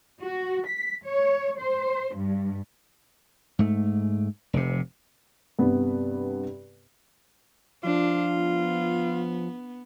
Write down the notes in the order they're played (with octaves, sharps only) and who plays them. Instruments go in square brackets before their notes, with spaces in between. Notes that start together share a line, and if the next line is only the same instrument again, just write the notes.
[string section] F#4
B6
C#5
C5
G2
[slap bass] G#2 A3
F1 G#2 C3
[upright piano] G2 C3 B3 B4
[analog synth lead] F3 [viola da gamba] D4 [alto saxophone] F4
[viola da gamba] B3